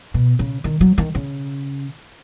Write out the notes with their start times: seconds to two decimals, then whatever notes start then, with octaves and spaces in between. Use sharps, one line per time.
0.14 B2
0.39 C#3
0.64 D#3
0.81 F#3
0.98 D#3
1.15 C#3